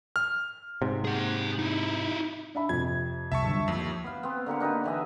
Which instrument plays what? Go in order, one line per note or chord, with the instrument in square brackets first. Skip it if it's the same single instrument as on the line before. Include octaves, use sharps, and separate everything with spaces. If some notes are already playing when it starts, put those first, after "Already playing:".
[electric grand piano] F6
[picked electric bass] G#2 C3
[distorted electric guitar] G#4 F#5
D#4 E4
[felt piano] D4 E5 B5
[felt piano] F2 C3 [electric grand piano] G#6
[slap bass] C2 [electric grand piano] E5 A5 C#6
[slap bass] G2 D3 F#3
[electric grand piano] D#2 [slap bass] F3
[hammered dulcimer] B3 F5
B3 C4
D3 A#3 G4 F#5
D4 D#4 G4 B4
D3 E3 D#5 E5